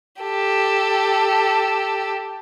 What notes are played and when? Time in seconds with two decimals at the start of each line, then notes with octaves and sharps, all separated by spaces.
0.22 G4 A4